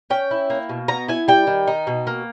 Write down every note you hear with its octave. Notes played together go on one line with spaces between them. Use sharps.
C#4 G5
E4
A#3
B2
B3 A#5
E4 G#5
G3 G5
D#3
D#4
B2
A#3